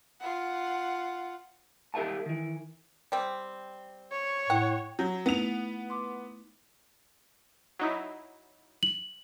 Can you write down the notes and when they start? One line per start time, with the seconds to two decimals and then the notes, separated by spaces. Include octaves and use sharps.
0.20 F4 F#5
1.94 G4 A#4 E5 F5 A5
2.26 D#3 E3
3.12 G3 C4
4.11 C#5
4.50 A2 F#5 G5
4.99 F#3 G6
5.26 A3 B3 D#4 E4 F7
5.90 C6 D6
7.79 F#3 D#4 E4
8.83 F#7